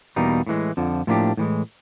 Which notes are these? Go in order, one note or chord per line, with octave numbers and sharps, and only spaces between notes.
E2 B2 G3 A#3 D#4
A2 E3 G#3
F2 D3 F3
A2 F3 A#3 D4 G4
A2 E3 G#3